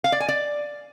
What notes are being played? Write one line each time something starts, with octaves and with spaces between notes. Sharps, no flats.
F5
D5
G#5
D5